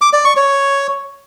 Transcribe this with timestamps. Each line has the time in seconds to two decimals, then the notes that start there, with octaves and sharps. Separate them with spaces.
0.01 D6
0.13 D5
0.25 C#6
0.37 C#5